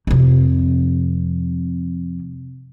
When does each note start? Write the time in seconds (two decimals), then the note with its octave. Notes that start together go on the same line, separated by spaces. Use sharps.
0.07 F2 C3